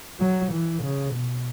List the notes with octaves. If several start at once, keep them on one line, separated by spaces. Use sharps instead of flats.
F#3
E3
C#3
B2